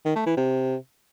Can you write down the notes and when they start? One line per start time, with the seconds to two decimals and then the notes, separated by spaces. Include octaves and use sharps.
0.05 D#3
0.16 A3
0.26 E3
0.37 C3